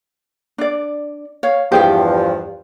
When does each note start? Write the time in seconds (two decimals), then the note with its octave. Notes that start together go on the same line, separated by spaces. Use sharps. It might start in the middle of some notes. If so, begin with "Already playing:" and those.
0.58 D4 D5
1.43 C#5 F5
1.72 E2 G2 F3 G4 G#4 G5